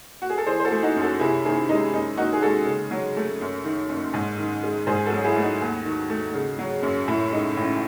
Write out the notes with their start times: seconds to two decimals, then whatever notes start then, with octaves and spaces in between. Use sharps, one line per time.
0.22 F#4
0.30 G#4
0.38 A4
0.46 E3 G#4 C5
0.60 C5
0.65 F#4 A4
0.72 A3
0.83 D#4 F#4
0.96 F#2
1.01 F#4 A4
1.19 C3 E4 G#4
1.45 D#3 E4 G#4
1.69 G#3 D#4
1.93 F#2 D#4
2.17 D#3 D#4 F#4
2.33 G#4
2.42 G#3 F#4 A4
2.66 C#3
2.91 F#3
3.17 A3
3.41 F#2
3.65 D#3
3.89 F#1
4.14 G#2
4.38 D#3
4.63 G#3
4.87 G#2 G#4 C5
5.06 F#4 A4
5.12 F#3
5.24 E4 G#4
5.36 A3
5.42 D#4 F#4
5.61 D#2
5.85 D#3
6.10 A3
6.34 C#3
6.59 F#3
6.83 F#2
7.08 A2 E4
7.32 G#3 D#4
7.56 A1 E4